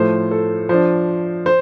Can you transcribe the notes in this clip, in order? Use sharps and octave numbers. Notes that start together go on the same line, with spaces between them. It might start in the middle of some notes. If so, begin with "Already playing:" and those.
Already playing: A2 F3 A3 C5
A4
F3 D4 C5
C5